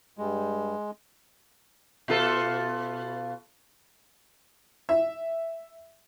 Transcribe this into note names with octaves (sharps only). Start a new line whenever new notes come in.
G2 G3 G#3
B2 F4 A4
E5